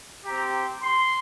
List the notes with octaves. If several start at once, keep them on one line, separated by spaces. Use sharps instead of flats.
C4 G4 A#5
C6